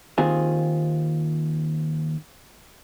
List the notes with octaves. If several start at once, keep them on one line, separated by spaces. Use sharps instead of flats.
D#2 D#3 C4 F4 G#4